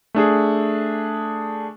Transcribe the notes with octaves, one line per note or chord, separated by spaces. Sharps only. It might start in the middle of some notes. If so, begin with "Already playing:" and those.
A3 D4 G#4